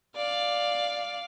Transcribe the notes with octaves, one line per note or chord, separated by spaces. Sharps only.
D5 F5